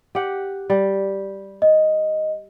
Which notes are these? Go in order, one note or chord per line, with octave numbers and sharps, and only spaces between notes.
G4 F#5
G3
D#5